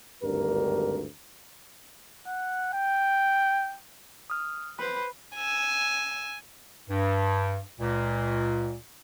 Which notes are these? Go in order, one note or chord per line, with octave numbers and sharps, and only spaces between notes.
G#1 D2 G2 G4 A#4
F#5
G5
D#6 F6
B4 C5 B5
G#5 E6
G2
C#2 A#2